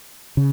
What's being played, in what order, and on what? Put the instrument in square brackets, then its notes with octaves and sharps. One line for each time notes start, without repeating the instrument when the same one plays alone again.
[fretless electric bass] C#3